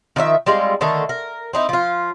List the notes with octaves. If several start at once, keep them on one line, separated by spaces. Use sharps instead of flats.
D#3 F3 D5 E5
G3 G#3 C4 F4
D3 D#3 A3 A4
A#4
C4 D#4 E4
F3 F4